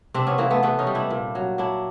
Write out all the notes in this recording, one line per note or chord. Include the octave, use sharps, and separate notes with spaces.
C3 C4 D4
B3 C#4
E3 A#3 C4
A3 B3
C3 A3 B3
C#4 D#4
G3
D4 E4
A#2
F#3
F#3 D4 E4